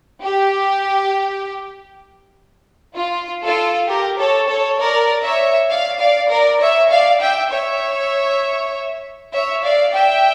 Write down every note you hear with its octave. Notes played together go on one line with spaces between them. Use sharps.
G4
F4
F4 A4
G4 A#4
A4 C#5
A4 C#5
A#4 D5
C#5 E5
D5 F5
D5 F5
A#4 D5
C#5 E5
D5 F5
E5 G5
C#5 E5
C#5 E5
D5 F5
E5 G5